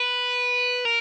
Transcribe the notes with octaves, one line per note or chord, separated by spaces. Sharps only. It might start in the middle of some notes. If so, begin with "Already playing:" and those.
Already playing: B4
A#4